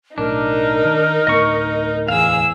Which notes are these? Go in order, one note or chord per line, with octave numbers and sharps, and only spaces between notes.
B1 A2 D4 D#4 A#4
D#3
D2 A2 B3 D#5 C#6
E2 G#4 F5 E6